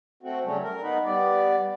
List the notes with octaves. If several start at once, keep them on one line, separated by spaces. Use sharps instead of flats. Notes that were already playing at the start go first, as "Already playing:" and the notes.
A3 C4 F#4
C#3 F#3 G3 A3 C#4
A#4
B3 D#4 B4
G3 B3 D5